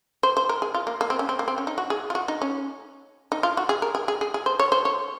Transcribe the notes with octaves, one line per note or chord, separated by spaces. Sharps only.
C5
C5
A#4
G#4
F4
A#3
A#3
C4
C#4
C4
A#3
C4
C#4
D#4
F#4
G#4
F4
F#4
D#4
C#4
D#4
F4
F#4
G#4
A#4
G#4
G#4
G#4
G#4
C5
C#5
C5
C#5